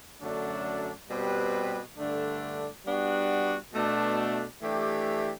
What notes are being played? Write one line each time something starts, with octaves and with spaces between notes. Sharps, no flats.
F#2 D3 F#3 A3 D4
B2 G3 C4 G4 B4
G2 D3 A3 D4
G3 B3 D4 F#4
B2 A3 D4
E3 A3 D4 G4